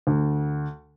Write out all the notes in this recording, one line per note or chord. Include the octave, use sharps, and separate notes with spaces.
D2